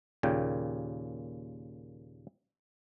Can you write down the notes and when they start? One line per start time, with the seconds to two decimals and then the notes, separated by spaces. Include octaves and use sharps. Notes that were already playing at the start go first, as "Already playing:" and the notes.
0.23 D#2 A#2 C#3 G5